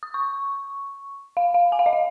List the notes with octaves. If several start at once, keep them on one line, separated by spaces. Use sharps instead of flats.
D#6
C#6
F5
F5
G#5
F5
D#5
F5